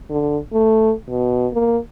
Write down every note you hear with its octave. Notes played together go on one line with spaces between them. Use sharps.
D3
A3
B2
A#3